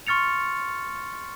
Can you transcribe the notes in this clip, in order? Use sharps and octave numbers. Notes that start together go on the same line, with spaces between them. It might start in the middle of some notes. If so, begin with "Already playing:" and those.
C6 C#6 F6 A6 C#7 F7